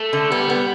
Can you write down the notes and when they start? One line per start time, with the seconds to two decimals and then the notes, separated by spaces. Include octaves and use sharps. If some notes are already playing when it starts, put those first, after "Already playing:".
Already playing: A3
0.13 D3
0.30 G3 B3
0.50 B3